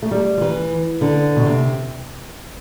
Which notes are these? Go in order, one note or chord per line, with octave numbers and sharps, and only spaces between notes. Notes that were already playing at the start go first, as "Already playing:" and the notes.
A3
G3
F3
E3
D3
B2
C3